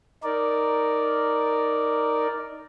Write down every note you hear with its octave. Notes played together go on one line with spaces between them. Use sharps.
D#4 A#4 D5